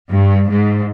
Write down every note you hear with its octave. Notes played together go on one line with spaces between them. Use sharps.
G2
G#2